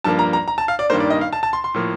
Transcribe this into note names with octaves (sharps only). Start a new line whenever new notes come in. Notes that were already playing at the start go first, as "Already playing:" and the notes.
G2 F3 A#3 A5
A#5
A#5
A#5
A5
F5
D5
G2 D#3 A#3 C5
D5
D#5
F5
A5
A5
C6
C6
A2 F3 A#3